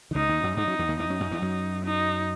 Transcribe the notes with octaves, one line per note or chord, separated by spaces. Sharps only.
D#3
C#2 C#3 D#4
D#2 D#3
F#2 F#3
G#2 G#3 D#4
F#2 F#3
E2 E3
D#2 D#3
E2 E3 D#4
F#2 F#3
F#2 F#3
E2 E3
F#2 F#3
D#4